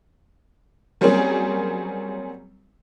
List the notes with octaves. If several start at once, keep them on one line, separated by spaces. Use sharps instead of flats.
F#3 G3 A#3 C4 C#4 G#4